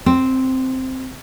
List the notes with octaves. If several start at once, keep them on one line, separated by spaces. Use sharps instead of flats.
C4